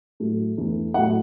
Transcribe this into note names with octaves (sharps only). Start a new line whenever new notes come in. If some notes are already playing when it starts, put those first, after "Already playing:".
A2 F#3 A3
E2 E3 A3
A2 F#3 A3 F#5